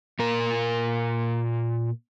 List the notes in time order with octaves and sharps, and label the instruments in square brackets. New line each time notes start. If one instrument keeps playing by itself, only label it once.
[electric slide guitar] A#2 A#4